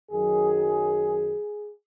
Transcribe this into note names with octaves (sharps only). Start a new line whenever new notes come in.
F#2 D#3 F#3 G#4